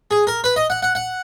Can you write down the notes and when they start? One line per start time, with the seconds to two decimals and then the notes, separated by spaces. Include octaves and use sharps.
0.11 G#4
0.27 A#4
0.44 B4
0.56 D#5
0.70 F#5
0.83 F#5
0.95 F#5